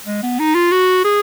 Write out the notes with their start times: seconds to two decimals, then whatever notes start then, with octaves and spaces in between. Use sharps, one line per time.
0.07 G#3
0.23 B3
0.39 D#4
0.55 F4
0.72 F#4
1.05 G#4